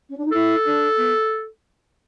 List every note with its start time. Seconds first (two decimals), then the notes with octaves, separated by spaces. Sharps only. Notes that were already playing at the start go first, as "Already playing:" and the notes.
0.09 C#4
0.17 D4
0.25 D#4
0.32 E4 A4
0.65 D4
0.97 B3